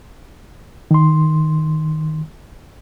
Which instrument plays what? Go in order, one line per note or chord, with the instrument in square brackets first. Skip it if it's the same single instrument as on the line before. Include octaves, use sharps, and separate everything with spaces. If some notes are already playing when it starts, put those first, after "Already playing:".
[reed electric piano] D#3 C6